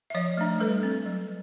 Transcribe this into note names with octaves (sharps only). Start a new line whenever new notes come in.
E5
F3 C#5 D#5
A3 D4
G3 A4 B4
C4
F#3